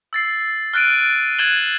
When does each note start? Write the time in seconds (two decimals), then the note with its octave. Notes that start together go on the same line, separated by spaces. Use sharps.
0.13 E6 A6 C7
0.74 F6 F#6 A6 D7 D#7
1.39 F#6 G#6 A6 E7 F#7 G7